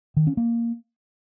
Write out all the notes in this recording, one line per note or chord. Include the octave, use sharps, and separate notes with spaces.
D#3
C#4
A#3